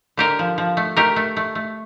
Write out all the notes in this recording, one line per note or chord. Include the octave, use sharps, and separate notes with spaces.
D3 G4 A#4
F3
F3
A3
A3 G4 A#4
A3
A3
A3